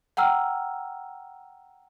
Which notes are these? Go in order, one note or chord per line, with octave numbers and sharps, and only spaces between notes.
F#5 G5 A#5 E6 F6